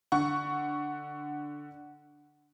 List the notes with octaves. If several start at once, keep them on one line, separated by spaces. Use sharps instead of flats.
D3 F#5 C#6